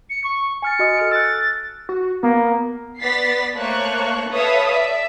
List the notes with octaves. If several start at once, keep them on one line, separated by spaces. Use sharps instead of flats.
C#7
C#6
G#5 F6 A6 C#7
F#4 D#5 D#6
A4 F6 D7
E6 F#6 A6
F#4
A#3 B3
B3 D5 A6 B6 C7
A3 A#3 C5 C#5 C#6 F#6
A4 B4 C#5 E5 F5 D#6
D5 E5